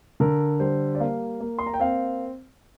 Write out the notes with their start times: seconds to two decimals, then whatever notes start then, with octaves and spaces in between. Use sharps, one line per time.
0.20 D3 A#4
0.60 G3 C5
0.95 D5
1.00 A#3 F5
1.41 A#3
1.59 C6
1.66 A#5
1.74 G5
1.80 C4 F5